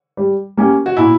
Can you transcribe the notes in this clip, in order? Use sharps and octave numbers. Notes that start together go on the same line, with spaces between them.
G3
A#3 C#4 G4
F#4
A#2 E4